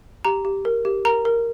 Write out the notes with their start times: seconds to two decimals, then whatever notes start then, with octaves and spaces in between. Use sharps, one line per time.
0.25 G4 A#5
0.45 G4
0.65 A#4
0.85 G4
1.05 A#4 A#5
1.25 A#4